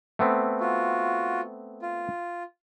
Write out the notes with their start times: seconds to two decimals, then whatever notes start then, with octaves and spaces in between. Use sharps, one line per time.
0.19 A3 B3 C4
0.60 F4 F#4
1.82 F4